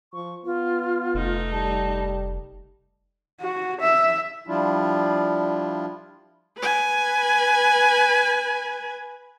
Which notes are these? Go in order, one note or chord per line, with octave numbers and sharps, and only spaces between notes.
F3 C#6
B3 F4
F1 A3 D#4
G3 A5
F#4
E5
F3 G3 D4 E4 F4
B4 G#5